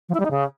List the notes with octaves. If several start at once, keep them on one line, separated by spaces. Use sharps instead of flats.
F3
E4
G3
D#4
C#3